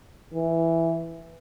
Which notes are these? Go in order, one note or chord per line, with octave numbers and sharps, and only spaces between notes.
E3